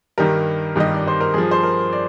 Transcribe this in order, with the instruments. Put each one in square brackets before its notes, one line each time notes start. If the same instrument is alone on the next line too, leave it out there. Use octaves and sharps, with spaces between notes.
[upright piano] G2 D#3 G3 A#4
G2 D#3 G3 D#5
D5
C5
A#4
G2 F3 G#4
C5
A#4
D5